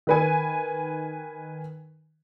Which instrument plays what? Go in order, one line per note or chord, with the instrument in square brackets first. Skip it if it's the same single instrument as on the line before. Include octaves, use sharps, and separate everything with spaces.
[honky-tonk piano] D#3 B4 G#5